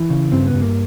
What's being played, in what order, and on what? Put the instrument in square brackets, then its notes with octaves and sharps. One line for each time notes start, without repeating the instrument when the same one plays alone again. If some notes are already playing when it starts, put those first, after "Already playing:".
Already playing: [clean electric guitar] E3
C#3
G2 C4
B3
G2
A#3